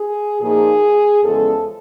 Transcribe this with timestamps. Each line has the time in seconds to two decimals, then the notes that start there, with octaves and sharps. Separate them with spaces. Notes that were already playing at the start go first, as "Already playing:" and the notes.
Already playing: G#4
0.41 A#2 F3 A#3 D#4 G#4
1.23 E2 C#3 F3 G#3 A4